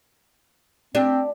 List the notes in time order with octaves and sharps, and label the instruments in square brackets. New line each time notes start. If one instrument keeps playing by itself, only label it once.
[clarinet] C4 [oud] D4 G4